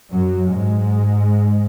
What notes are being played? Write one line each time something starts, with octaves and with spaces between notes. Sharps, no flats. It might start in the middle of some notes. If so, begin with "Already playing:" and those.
F#2 F#3
G#2 G#3